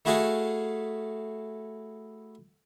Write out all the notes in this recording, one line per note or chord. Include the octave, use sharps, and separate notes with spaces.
A3 E4 F#4 G#4 A4 F5